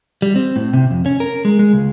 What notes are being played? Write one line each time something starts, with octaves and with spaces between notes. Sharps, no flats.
G3
C4
A2
C3
F2
C#4
A#4
G#3
G#3
C#2